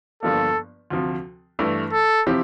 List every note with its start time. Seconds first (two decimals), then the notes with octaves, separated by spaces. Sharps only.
0.23 G1 G2 F3 A#3 A4
0.90 D2 C3 F3
1.59 G2 E3 A3 E4
1.93 A4
2.26 C3 F3 C4 E4 G4